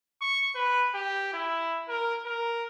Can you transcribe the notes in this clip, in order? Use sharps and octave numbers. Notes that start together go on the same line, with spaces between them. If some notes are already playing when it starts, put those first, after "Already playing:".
C#6
B4
G4
E4
A#4
A#4